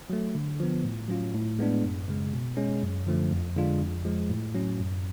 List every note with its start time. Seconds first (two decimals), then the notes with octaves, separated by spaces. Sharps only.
0.10 F#3 A3
0.35 D3
0.60 F3 B3
0.84 A2
1.08 F#3 C#4 F4
1.34 A2
1.59 G#3 B3 D4
1.83 F#2
2.08 C#3 G#3
2.33 B2
2.57 G#3 C#4
2.82 F#2
3.07 D3 F3 A3
3.31 F2
3.56 D3 G#3 D4 F4
3.81 F2
4.05 F3 G#3
4.30 A2
4.55 F#3 C#4
4.79 F#2